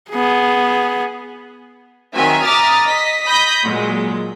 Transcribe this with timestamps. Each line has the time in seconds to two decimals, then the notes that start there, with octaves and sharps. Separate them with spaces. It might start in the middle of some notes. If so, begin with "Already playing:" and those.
0.11 B3 G#4
2.15 D#3 F#3 C4 E5 G#5
2.44 E5 A#5 D6 D#6 F6 A6
2.86 D#5 B6
3.26 B5 D#6 G6 A#6 B6
3.62 A#2 F#3 G#3